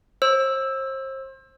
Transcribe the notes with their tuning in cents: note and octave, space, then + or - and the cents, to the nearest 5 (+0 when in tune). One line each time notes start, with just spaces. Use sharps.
C5 +35 E6 +0